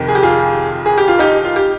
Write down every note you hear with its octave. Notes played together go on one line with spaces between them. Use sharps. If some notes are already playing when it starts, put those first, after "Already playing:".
Already playing: F2 C3 D#3
G#4
G4
F4 G#4
G#4
G4
F4
D#4 G4
F4
G4